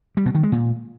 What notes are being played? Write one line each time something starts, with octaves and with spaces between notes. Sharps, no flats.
G3
B2
D#3
G#3
A#2